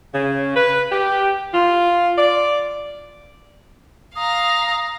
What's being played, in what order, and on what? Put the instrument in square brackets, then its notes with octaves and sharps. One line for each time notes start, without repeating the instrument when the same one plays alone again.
[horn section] C#3
B4
G4
F4
D5
[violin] F5 A#5 [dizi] D#6